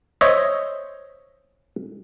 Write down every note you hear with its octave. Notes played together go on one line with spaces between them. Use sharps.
C5 C#5 D#5 E5